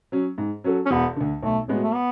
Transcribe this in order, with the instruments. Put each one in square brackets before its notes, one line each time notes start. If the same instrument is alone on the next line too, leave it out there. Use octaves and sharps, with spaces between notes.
[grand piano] F#3 C#4
G#2
F#3 C#4 F#4 A4
[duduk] C#4
[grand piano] E1 [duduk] B3
[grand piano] D2 D3
[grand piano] B1 [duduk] A3
[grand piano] A2 G#3 B3 F#4
[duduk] A3
B3